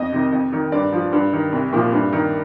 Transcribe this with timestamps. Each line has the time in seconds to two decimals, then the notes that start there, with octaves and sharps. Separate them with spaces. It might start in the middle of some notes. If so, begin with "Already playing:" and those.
Already playing: F2 D#5
0.12 C3 D#3
0.32 F2
0.52 D#3
0.72 G2 D5
0.92 F3
1.13 G2
1.33 D#3
1.52 C2
1.73 A#2 F3
1.93 G2
2.13 D#3